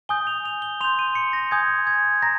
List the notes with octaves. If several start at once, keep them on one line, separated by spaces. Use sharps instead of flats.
G#5 D#6 G6 G7
F7
F7
G7
C6 G6 F7
D#7
C#7
A#6
G#5 D#6 G6 G#6
G#6
A#5 A#6